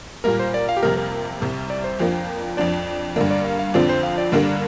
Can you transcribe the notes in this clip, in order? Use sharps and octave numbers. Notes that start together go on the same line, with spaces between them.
A#2 G3 A#3 A#4
C5
D5
F5
G4
F2 C3 G3 A#3 A#4
A#4
C2 C3 G3
D5
C5
F2 F3 A#3 D4
F2 F3 D4 D5
G2 D3 A#3 D5
D5
F5
F5
F2 D3 F3 C4 D5
C5
F5
D5
G2 D3 G3 A#3 D4 D5